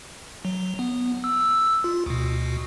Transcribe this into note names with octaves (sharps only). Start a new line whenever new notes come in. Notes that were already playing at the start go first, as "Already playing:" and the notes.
F#3
B3
E6
F4
D2 B2